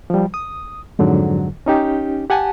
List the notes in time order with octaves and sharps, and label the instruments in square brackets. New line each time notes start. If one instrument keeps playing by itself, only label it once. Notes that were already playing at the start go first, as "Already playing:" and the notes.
[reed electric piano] F3 G3
D#6
F2 G#2 D3 F#3
C#4 D#4 G4
G4 F#5 G#5 A5